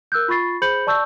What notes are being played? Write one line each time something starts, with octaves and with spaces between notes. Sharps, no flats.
A#4 E6 F#6 G6
F4 B5 C#6 A6 C7
G#4 C5 B5 G6 C#7 F#7
D5 A5 C#6 E6 G6